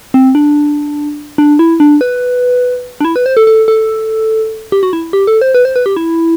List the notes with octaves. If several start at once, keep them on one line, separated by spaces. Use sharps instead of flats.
C4
D4
D4
E4
D4
B4
D4
E4
B4
C5
A4
A4
A4
G4
F#4
E4
G4
A4
C5
B4
C5
B4
G4
E4